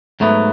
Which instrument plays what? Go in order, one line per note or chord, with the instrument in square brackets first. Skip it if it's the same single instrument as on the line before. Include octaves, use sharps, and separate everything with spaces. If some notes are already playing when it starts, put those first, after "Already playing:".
[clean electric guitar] G#2 F#3 B3 [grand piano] A3